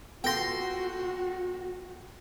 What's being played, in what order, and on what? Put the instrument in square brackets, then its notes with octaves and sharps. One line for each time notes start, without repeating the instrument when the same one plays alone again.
[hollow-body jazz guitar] B3 F4 [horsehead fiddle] F#4 [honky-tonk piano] A4 A#6 [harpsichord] G5 C6